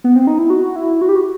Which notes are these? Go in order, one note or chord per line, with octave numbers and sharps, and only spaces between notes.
B3
C4
D#4
E4
F#4
E4
F#4
G4
F#4